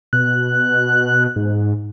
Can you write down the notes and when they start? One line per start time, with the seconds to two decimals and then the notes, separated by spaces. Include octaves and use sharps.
0.13 B2 F#6
1.36 G#2